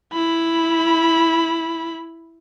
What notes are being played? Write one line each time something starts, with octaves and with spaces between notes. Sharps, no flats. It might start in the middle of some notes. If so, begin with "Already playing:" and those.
E4 B5